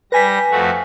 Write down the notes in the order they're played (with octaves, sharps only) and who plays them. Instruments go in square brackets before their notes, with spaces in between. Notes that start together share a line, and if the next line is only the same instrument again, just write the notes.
[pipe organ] G3 A#6 [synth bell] B4 G#5 B6
[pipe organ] F2 A3 F#4